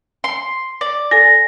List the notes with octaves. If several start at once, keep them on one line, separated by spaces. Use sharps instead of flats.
C6
D5
A4 G#5 A#6